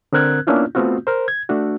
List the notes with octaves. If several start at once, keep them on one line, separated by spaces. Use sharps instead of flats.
D3 C4 A#4 F#6 G#6
A#3 B3 C#4 D4 E4 F4
A3 B3 C4 F4 F#4
A#4 C5
G#6
A3 D4 F#4